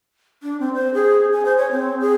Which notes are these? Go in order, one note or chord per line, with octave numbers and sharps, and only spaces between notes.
D4
C4
C5
G#4
G#5
C5
C#5
C4
G#4